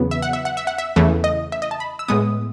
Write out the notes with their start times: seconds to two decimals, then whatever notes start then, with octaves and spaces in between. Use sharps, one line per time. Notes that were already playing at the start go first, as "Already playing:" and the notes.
Already playing: E2 C#3 F#3 B3
0.11 E5
0.22 F#5
0.33 E5
0.45 F#5
0.57 E5
0.67 F#5
0.78 E5
0.96 E2 C#3 E3 A3
1.24 D#5
1.52 E5
1.62 D#5
1.71 A5
1.80 B5
1.99 E6
2.08 A2 G#3 B3 D#6